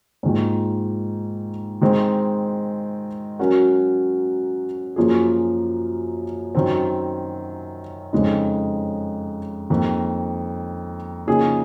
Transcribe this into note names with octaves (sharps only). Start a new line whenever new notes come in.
G#2 D#3 A#3 F4
D#3 G#3 C4
F#3 C#4 F#4 A#4
F#2 F3 A#3 F4 G#4
F#2 D#3 F#3 C4
F2 C#3 G#3 D#4
F2 D#3 A#3
C#3 F3 A#3 D#4 G#4